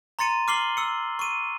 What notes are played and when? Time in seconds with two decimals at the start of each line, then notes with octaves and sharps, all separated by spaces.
0.19 A#5 C6 A6 C#7 D#7
0.48 D6 F6 C7 F#7 G7
0.77 E6 C#7
1.19 C#6 D#7